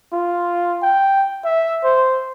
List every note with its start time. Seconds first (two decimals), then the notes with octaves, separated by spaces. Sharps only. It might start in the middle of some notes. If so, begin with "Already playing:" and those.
0.13 F4
0.83 G5
1.45 E5
1.84 C5